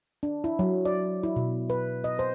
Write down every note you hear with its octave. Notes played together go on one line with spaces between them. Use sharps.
D4
E4
F#3
D5
E4
B2
B4
D#5
C5